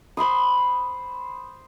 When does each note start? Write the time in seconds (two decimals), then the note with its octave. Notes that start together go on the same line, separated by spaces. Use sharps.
0.17 C5 B5 C6 D#6